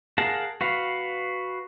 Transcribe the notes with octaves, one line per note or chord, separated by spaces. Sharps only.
G#4 A#4 F5 F#5 A5
F#4 B4 F5